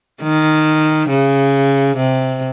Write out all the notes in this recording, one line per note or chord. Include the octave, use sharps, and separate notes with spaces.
D#3
C#3
C3